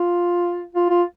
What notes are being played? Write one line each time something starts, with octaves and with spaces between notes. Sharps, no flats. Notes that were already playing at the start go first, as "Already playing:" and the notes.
Already playing: F4
F4
F4